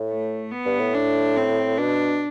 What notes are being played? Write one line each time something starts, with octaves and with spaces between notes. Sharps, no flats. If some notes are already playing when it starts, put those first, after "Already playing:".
Already playing: A2
A3
B3
G2
A2
D4
C4
B2 D4